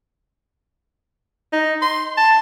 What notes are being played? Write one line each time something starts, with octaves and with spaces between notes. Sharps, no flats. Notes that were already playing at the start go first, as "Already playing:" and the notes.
D#4
C6
A5